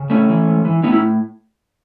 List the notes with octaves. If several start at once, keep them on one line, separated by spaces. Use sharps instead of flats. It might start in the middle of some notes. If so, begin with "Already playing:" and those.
Already playing: C#3
A2 A3 C#4
E3
G#2
E3
A2 B3 D#4
C#4 E4